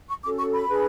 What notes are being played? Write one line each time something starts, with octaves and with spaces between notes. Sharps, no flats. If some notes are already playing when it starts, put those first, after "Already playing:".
C#6
C#4 F#4 A4 D6
C#6
B5
D4 G#4 B4